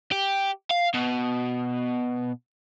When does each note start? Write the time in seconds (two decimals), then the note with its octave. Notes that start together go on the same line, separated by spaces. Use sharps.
0.12 G4
0.70 F5
0.94 B2